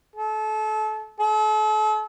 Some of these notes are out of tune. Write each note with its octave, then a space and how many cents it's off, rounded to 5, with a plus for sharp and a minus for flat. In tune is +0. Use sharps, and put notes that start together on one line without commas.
A4 -30
A4 -40